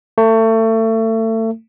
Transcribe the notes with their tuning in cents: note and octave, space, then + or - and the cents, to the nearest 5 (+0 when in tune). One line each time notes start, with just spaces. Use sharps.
A3 +30